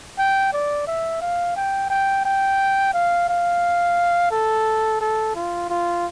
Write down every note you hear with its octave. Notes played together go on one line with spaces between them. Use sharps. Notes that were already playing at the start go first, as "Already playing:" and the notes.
G5
D5
E5
F5
G5
G5
G5
F5
F5
A4
A4
F4
F4